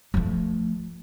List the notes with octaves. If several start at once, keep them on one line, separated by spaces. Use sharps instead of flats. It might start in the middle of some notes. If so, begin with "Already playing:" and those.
F3 A3